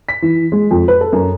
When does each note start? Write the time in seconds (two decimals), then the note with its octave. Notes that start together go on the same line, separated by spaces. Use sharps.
0.09 B6
0.22 E3
0.52 G#3
0.71 F2
0.88 B4
1.01 A4
1.13 F#2